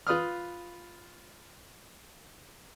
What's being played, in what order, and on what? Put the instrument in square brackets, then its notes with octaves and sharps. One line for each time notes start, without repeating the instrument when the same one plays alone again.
[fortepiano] F4 B4 D#6 F6